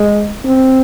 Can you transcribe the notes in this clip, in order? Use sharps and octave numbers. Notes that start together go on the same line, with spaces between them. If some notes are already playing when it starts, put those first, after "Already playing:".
Already playing: G#3
C4